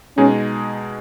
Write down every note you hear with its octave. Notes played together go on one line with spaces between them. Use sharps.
B2 G#3 C#4 D#4 G#4